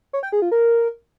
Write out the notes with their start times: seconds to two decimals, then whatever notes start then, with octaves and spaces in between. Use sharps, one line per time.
0.13 C#5
0.23 G5
0.32 G#4
0.42 F4
0.52 A#4